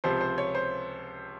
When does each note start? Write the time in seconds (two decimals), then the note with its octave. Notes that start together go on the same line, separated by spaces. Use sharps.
0.04 C#2 C3 F3 C5
0.21 C5
0.38 C#5
0.55 C5